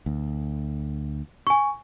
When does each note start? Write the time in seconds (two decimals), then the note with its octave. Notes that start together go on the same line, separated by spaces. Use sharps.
0.06 D2
1.47 G#5 C#6